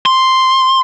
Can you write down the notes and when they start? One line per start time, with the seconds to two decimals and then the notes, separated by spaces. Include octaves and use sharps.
0.06 C6